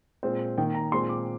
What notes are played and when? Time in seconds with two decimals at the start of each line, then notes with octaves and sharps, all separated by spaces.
0.23 A#2 G#3 C4 C5
0.58 D#3 A#3 G5
0.75 A#5
0.92 A#2 G#3 C4 C6
1.09 D6